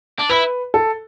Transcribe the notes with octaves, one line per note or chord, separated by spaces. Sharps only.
D4
E4 B4
A4